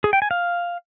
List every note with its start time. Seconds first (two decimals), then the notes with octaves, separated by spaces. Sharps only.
0.04 G#4
0.13 G5
0.22 G#5
0.31 F5